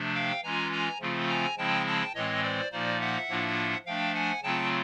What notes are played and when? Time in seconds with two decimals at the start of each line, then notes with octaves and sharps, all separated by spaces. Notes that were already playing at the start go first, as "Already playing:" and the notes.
Already playing: C3 F3 A3 D4
0.15 F5 G5
0.43 E3 G#3 C#4 F4 G#5 A#5
0.72 G#5 A#5
1.00 C#3 F3 A3 C4 F4
1.29 G#5 A#5
1.57 C#3 F3 G#3 C4 E4 G5 A5
1.86 G5 A5
2.15 A2 E3 G#3 C4 C#5 D#5
2.43 C5 D5
2.71 A#2 F3 A#3 D#4 C5 D5
3.01 E5 F#5
3.29 A2 F3 A#3 D4 F4
3.86 F3 A3 D4 F5 G5
4.14 F#5 G#5
4.43 C#3 F#3 A3 C4 F4 G5 A5